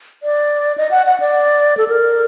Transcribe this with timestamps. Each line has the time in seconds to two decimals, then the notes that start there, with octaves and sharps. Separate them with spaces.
0.23 D5
0.78 D#5
0.91 F#5
1.06 F#5
1.20 D5
1.77 A4
1.88 A#4